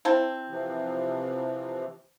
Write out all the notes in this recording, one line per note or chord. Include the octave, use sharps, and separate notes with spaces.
C4 E4 A5
C3 E3 F3